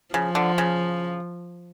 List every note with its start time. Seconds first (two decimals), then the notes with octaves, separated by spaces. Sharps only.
0.14 C#3 F3
0.35 D3
0.58 C#3